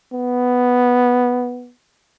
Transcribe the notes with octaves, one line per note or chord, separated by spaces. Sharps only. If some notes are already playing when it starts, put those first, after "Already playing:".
B3